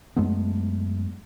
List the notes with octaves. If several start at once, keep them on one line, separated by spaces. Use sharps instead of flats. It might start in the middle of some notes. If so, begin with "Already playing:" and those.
F#2 G#3 A3 B3